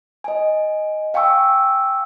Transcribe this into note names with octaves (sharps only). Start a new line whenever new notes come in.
D#5 G#5
F5 G5 G#5 C#6 E6